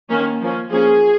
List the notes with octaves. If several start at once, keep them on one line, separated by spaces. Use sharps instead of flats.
D#3 A#3 C#4
F3 A#3 C#4
F3 A#3 C#4 G#4